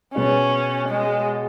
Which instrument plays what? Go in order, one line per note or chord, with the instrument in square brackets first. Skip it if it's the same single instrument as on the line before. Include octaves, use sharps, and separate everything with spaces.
[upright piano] B2 B3 G#4 C#5 [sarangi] C#4
[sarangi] G#3